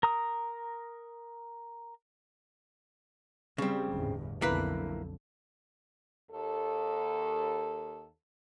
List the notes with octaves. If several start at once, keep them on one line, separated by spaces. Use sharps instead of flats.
A#4 A#5 D#6
C#3 G3 C4
G1 E2 A2
B1 F2 D3 A#3 E4 B4
D#2 A4